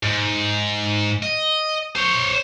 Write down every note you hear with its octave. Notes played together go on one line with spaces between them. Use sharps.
G#2
D#5
C5 C#5